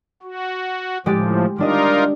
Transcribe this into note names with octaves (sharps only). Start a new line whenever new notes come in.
F#4
A2 F3 G#3 G4 A6
G3 D4 D#4 F4 A#4 D#5